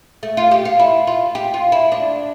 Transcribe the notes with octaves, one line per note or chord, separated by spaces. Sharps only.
A3
F4
G4
F4
E4
F4
G4
F4
E4
D4